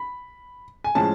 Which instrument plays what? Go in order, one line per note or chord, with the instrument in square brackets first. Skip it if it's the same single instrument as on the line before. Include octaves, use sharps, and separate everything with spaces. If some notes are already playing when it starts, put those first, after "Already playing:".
Already playing: [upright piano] B5
G#5
A2 F3 G#3 C#4 A5